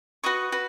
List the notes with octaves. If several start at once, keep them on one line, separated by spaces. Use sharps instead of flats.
F#4 B4 D#5 C#6
F#4 B4